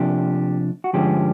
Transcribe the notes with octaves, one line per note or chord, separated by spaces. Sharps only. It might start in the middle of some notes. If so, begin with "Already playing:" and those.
Already playing: C3 F3 A#3 D4 G4
F#4
G2 D3 F3 G#3 C#4 G4